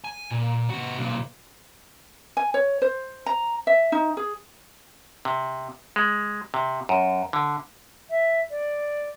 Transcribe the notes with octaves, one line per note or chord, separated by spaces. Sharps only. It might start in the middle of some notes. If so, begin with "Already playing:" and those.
G#5
A#2
C3 F#4
B1 A#2
G#5
C#5
C5
A#5
E5
D#4
G#4
C3
G#3
C3
F#2
D3
E5
D5